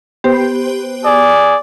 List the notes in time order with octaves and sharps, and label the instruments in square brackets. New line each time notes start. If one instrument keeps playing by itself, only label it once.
[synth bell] B3 G4 C5
[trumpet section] G#4 D5